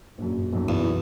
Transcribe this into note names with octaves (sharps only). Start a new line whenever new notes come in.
A#1 F#2
B1 F#2
E2